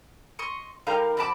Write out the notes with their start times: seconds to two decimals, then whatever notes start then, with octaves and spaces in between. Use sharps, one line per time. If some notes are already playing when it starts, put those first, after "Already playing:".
0.39 D#5 C6 C#6
0.87 G3 D#4 A#4 F5 G5 G6
1.17 F2 F#4 A5 B5 D6